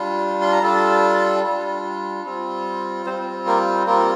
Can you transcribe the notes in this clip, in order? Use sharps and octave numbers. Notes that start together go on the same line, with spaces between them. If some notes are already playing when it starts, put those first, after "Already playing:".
Already playing: G3 D4 F4
C6
A#5
G3 D4 F4 A4 A5
G3 D4 F4
G3 C4 F4
G3 C4 F4 C5
A#3 A#4
G3 A#3 C4 F4 A#4